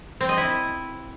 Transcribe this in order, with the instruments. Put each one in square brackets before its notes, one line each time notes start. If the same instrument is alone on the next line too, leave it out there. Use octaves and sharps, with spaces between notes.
[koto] C4
D#5
E4